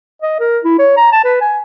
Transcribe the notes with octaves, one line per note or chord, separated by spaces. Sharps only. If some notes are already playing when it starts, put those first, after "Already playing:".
D#5
A#4
E4
C#5
A#5
A5
B4
G#5